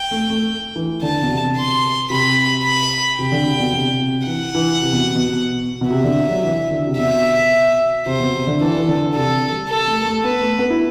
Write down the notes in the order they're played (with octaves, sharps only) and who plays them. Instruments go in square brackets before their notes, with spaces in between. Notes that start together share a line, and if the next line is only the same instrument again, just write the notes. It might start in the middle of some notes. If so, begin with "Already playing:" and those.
Already playing: [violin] G5
[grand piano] A3
A3
E3
[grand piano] D3 [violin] A5
[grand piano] B2
C3
[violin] C6
[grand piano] C3 [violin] B5
[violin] B5
[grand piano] C3 [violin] G5
[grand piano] D3
C3
B2
C3
C3
[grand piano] E3 [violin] F#5
[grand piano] E3
C3
B2
B2
B2
[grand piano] C3 [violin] E5
[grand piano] D3
F#3
E3
D3
C3
[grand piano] B2 [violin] E5
[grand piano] C3 [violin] C5
[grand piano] B2
C3
D3
[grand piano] E3 [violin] A4
[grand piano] E3
D3
[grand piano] C3 [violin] A4
[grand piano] G3
[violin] A4
[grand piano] A3
A3
[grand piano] B3 [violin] B4
[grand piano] A3
B3
E4